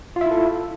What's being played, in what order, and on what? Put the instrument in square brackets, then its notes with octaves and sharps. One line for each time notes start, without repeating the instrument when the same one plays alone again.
[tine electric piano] F4
E5
E4
A4